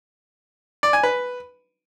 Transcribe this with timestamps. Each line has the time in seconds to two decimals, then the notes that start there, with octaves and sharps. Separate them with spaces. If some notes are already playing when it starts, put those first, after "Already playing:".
0.83 D5
0.93 G#5
1.03 B4